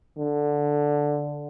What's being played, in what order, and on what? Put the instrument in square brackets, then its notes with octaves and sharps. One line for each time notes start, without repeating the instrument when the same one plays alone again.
[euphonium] D3